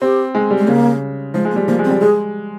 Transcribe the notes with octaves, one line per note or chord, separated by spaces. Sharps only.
C4 G4
G#3
G3
G#3
C#3 A#3
F3 G#3
G#3
A#3
G3
F3 A#3
G#3
C4
G3
G#3 G#4